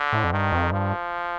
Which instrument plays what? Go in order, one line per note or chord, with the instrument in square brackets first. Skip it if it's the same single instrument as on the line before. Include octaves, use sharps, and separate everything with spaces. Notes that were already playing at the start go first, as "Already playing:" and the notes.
Already playing: [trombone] D3
[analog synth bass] A2
F2
[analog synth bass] G2 [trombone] D#3
[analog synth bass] F2
[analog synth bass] G2 [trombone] F3